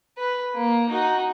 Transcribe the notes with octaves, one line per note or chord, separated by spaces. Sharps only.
B4
A#3
D#4 F#4